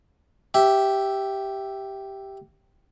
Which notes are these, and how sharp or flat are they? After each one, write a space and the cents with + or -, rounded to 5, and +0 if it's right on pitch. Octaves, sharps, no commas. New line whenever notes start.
G4 -5 E5 +0